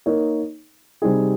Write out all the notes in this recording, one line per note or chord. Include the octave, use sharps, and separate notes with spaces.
A#3 D#4 A#4 C#5
C3 G3 C4 D#4 G#4